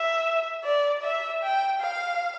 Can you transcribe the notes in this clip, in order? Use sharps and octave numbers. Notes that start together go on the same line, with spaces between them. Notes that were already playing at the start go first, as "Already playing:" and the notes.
Already playing: E5
D5
E5
G5
F5